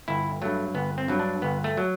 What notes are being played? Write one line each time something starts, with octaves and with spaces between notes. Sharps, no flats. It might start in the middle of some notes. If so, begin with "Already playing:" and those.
G1 E4
G2 F#3 A3
G1 B3
C4
G2 F#3
D4
G1 B3
A3
F#3